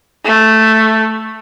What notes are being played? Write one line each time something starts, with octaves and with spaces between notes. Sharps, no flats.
A3